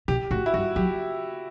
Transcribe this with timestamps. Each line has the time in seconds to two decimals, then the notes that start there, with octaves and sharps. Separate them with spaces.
0.08 B2 G4
0.31 A2 F#4
0.46 E4
0.54 G2 F#4
0.76 F#3 G4